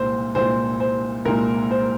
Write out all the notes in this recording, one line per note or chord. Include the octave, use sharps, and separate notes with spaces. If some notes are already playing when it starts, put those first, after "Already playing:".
Already playing: C2 A#2 G#3 C5
C2 A#2 G#3 C5
C5
C2 A#2 G#3 A#4
C5